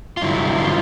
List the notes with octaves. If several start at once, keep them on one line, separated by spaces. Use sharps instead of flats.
F4
G2 D3 F#3 E4
F4